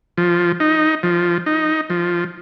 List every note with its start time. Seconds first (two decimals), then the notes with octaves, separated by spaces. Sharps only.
0.18 F3
0.60 D#4
1.03 F3
1.46 D#4
1.90 F3